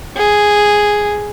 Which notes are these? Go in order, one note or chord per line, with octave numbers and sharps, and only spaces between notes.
G#4